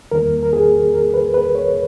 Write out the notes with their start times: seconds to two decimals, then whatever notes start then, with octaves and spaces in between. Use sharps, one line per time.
0.12 E2 D#3 G3 A#3 A#4
0.43 A#4
0.53 G#4
0.94 A#4
1.14 B4
1.34 B4
1.55 C#5